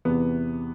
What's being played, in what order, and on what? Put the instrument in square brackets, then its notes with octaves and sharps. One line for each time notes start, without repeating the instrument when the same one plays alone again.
[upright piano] E2 C3 E3 B3